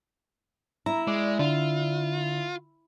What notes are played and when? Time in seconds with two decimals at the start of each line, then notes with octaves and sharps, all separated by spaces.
0.86 E4 A#5
1.08 G#3 D5
1.39 D3 F4